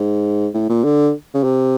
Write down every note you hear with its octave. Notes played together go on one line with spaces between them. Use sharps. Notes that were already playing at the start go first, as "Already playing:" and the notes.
Already playing: G#2
A2
A#2
D3
C#3
C3